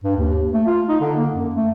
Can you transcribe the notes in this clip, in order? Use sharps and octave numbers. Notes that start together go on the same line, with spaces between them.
G2
D#2
A3
F4
D#4
D3
A#3
F#2
A3